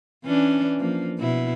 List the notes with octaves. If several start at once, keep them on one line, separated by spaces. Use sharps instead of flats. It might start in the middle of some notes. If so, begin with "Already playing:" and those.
E3 C#4 D4
F3 A#3
B2 E4